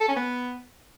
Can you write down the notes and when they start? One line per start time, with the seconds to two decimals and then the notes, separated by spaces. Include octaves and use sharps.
0.01 A4
0.09 C#4
0.16 B3